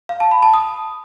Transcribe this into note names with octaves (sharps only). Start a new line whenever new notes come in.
F5
A5
B5
A5
D#6